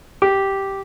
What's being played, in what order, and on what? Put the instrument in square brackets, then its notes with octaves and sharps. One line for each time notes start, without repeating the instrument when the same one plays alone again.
[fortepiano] G4